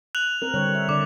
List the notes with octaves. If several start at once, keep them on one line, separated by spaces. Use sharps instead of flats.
F#6 F7 F#7
C4 A#4
D3 G3 C#5
E5
D3 D5 D6